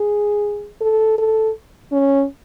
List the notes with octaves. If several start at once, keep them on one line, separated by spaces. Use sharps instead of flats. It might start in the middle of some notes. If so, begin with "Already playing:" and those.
Already playing: G#4
A4
A4
C#4